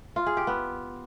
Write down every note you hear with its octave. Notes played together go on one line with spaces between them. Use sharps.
F4
G#4
G4
B3